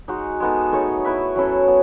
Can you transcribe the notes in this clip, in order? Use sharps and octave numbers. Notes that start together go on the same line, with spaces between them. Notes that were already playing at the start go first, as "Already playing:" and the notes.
G#3 D#4 F#4
G#3 B3 D#4 A4
A3 D#4 G#4 C#5
E4 B4 E5
F#3 C#4 E4 A4
B3